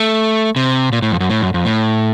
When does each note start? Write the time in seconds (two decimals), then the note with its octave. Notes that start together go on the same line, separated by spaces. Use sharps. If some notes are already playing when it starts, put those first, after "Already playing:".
Already playing: A3
0.56 C3
0.93 A#2
1.02 A2
1.12 F2
1.20 F#2
1.30 A2
1.42 F#2
1.54 F2
1.65 A2